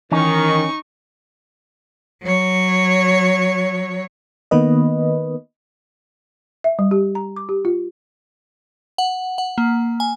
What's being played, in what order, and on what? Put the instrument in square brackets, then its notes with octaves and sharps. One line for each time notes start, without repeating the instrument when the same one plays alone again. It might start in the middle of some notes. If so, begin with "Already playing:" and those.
[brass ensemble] D#3 [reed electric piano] E3 [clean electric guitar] C#4 [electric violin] D#4 C#6
[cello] F#3 C#5
[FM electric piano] D#3 A#3 B3 B4 D#5
[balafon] E5
G3
G4
A#5
D6
G4
F4
[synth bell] F#5
F#5
A#3
G#5